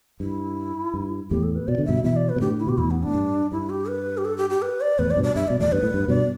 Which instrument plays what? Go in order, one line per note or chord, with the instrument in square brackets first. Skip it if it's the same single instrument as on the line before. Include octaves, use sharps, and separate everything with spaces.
[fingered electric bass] G2 [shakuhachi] E4
[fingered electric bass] G2
[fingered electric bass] E2 A2 [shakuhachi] G4
[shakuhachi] A4
B4
[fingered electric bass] B2 [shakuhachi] D5
[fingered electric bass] D3
[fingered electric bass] G2 B2 [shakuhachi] E5
[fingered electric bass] B2 E3 [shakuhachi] E5
[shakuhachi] D5
B4
[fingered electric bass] B2
[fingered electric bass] A2 D3 [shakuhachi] G4
[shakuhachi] E4
[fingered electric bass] B2 [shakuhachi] G4
[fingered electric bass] E2 A2 [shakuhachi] E4
[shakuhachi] B3
[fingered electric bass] A2 [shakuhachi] D4
[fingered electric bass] G2
[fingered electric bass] G2 [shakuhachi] E4
[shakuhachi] G4
B4
G4
A4
G4
G4
B4
D5
[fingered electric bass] E2 A2 [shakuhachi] B4
[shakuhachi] D5
[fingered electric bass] G2 B2
[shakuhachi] D5
[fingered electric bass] G2 [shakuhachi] E5
[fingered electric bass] B2 [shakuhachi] D5
[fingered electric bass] E2 A2 [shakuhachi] D5
[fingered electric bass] G2 [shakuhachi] B4
[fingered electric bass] A2
G2
[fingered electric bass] G2 B2 [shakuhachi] D5